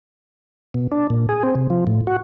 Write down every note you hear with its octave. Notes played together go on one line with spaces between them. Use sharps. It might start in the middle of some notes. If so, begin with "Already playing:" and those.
B2
D4
A#2
G#4
C4
C3
F3
A2
F#4